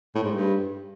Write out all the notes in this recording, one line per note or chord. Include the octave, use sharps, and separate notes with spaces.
A2
G#2
G2